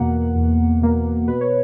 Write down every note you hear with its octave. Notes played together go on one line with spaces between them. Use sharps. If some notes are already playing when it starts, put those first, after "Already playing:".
Already playing: E2 B2 A#3 F#5
E2
B2 A#3
B2 B4
C#5